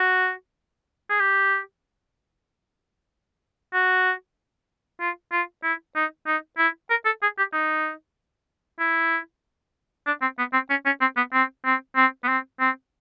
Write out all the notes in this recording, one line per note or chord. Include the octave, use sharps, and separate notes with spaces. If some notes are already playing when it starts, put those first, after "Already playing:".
Already playing: F#4
G#4
G4
F#4
F4
F4
E4
D#4
D#4
E4
A#4
A4
G#4
G4
D#4
E4
D4
C4
B3
C4
C#4
C#4
C4
B3
C4
C4
C4
B3
C4
C4